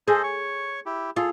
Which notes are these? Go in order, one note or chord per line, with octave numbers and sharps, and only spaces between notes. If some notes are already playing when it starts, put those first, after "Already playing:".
G#4 A4 C5 D#5
C#5 C#6
E4 G4
F4 G#4 A4